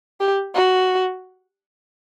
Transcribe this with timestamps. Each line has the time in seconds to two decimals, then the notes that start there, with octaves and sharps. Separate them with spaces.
0.20 G4
0.55 F#4